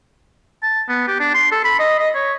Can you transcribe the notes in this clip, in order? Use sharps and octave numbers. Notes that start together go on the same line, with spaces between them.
A5
B3
G4
D4
C6
A4
B5
D#5
D#5
C#5